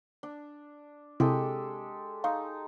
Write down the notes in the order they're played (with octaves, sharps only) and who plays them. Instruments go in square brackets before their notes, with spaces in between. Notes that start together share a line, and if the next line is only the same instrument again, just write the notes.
[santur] D4
[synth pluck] C3 C4 E4 [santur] G#3 G4 A4
[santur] D#4 [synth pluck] F5 C6 C#6